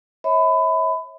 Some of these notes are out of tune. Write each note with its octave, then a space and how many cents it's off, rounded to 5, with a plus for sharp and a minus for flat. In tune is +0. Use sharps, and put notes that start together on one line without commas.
C#5 -25 E5 -40 B5 +25